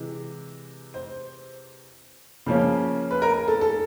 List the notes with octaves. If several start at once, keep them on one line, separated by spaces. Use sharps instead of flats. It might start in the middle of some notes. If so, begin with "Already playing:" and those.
Already playing: C3 E3 G#3
C5
C#3 F3 A#3 C#4
B4
A#4
A4
A4